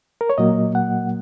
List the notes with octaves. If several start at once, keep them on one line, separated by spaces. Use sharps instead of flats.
A#4
C#5
A#2 F#3 A#3 D#5
F#5